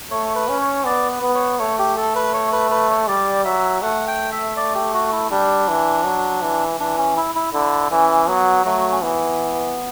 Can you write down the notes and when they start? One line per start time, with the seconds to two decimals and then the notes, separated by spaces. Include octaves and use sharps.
0.11 A3 C#5
0.35 B4
0.48 C#4
0.61 C#5
0.86 B3 D5
1.10 B4
1.23 B3
1.35 C#5
1.59 A3 C#5
1.79 G4
1.97 A4
2.15 B4
2.34 C#5
2.52 B4
2.71 B4
2.89 C#5
3.08 G3 D5
3.45 F#3 E5
3.82 A3 F#5
4.08 G5
4.32 E5
4.57 D5
4.75 G4
4.94 F#4
5.12 E4
5.31 G3 D4
5.69 E3
6.05 F#3
6.42 E3
6.79 E3 D4
6.98 C#4
7.17 E4
7.35 E4
7.54 D3 E4
7.91 E3 C#4
8.28 F#3 B3
8.65 F#3 A3
8.91 C#4
9.02 E3 B3